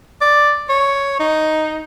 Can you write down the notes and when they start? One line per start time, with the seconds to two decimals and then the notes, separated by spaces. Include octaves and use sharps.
0.21 D5
0.69 C#5
1.20 D#4